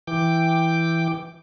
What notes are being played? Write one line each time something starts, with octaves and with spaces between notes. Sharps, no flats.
E3 G5 D6